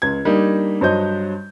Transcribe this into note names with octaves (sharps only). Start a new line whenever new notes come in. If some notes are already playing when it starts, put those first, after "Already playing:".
C#2 G#6
G3 A#3 D4 D#4
G2 F#3 C5 C#5 D#5 G6